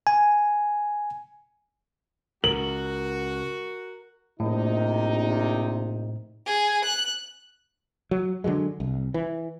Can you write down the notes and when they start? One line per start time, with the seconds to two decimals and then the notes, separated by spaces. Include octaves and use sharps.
0.07 G#5
2.44 C#2 F#4 A#4 F#7
4.40 A#1 A2 C3 D#4
6.46 G#4
6.84 F#6
8.11 F#3
8.44 D3 E3 F#3 G#3
8.80 C2
9.14 E3